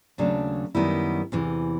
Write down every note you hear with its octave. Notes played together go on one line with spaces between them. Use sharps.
D#2 C#3 F#3 A3 D4
F#2 D#3 G3 B3 E4
E2 C3 E3